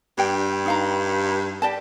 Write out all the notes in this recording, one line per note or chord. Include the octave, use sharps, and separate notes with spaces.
G2 D4 G5
D#4 F5 A#5
G4 D5 A5